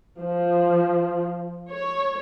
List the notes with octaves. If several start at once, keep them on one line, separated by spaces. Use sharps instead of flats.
F3
C#5